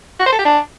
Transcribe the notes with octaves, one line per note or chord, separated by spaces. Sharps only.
F#4
C5
A4
G4
D4